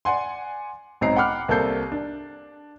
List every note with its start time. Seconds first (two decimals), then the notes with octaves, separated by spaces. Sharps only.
0.05 D5 F#5 G#5 C6
1.01 B1 G#2 C4 A#5 C7
1.16 F#5 G5 B5 D6 F6 F#6
1.48 C2 A#3 C4 A4 G6 C7
1.92 D4